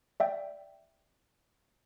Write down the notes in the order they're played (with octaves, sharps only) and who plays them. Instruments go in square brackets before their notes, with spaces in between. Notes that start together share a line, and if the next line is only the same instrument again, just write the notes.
[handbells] D5 E5 G5